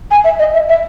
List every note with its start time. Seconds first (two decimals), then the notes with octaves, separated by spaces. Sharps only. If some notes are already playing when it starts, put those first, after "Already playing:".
0.11 G#5
0.24 E5
0.39 D#5
0.54 E5
0.69 E5